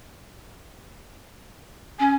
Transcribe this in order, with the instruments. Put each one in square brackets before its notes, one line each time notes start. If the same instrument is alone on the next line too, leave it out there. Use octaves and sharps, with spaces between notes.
[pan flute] C#4 [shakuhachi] G#5